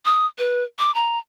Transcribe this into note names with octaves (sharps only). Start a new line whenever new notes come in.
D#6
B4
D6
A#5